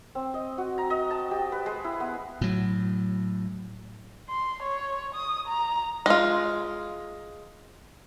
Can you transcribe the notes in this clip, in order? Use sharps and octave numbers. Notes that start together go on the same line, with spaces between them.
C4
D#5
F#4
A#5
D#5
A5
G4
B4
G#3
E4
B3
A2 F#3
C6
C#5
D#6
A#5
G#3 F4